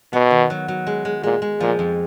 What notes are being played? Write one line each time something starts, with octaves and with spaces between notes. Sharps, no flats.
B2 B3
D#3
F#3
F#3
G#3
G#3
A#2 G#3
G#3
A#2 F3
F2